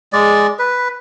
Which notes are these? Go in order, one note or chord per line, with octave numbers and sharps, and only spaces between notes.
G#3 D5
B4